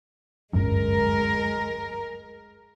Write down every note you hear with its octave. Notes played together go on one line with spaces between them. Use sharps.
D1 G1 F#2 G#3 A#4